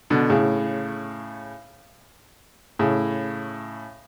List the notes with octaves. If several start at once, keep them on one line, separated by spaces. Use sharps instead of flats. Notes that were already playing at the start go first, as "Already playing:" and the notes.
B2 D3
A2 C#3
A2 C#3